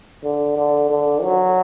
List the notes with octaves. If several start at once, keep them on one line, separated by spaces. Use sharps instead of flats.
D3
D3
D3
F#3